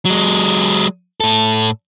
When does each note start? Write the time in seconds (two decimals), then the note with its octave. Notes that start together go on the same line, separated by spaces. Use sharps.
0.05 F#3 G#3
1.20 A2 A4